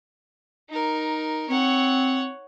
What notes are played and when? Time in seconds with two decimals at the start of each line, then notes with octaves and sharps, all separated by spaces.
0.69 D#4 A#4
1.49 C4 C#5 F#5